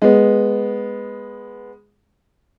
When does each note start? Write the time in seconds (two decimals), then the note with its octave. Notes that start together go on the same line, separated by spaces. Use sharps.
0.02 G#3 B3